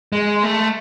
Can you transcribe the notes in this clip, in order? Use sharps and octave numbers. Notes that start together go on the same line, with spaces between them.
G#3
A3